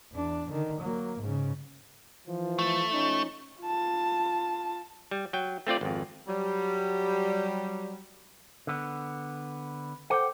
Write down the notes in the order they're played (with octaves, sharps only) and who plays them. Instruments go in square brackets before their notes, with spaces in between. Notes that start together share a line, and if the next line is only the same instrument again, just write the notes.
[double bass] E2 D4
D3 D#3
F#3 A#3
G#2 C#3
[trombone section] E3 F3
[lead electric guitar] A3
[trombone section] F3 C#4 D#4
[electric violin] F4 A5
[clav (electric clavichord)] G3
F#3 G5
A3 C4 F4 D5
G#1 F2
[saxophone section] F#3 G3
[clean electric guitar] D3 B3
[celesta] A4 C5 D6 [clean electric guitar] F#5 G5